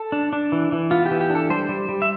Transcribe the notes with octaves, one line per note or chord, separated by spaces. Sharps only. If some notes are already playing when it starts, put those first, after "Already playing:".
Already playing: A4
D4
D4
E3
E3
B3 F4
G4
E3
G4
D4
A4
G3 C5
G3
G3
E5